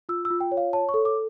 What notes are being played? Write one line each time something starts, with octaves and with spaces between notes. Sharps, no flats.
F4 E6
E6
F4
G5
C#5
F5
C#5 A5
C#6
A4
D6